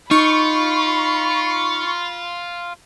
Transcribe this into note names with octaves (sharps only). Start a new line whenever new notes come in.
D#4 F4 B5 C#6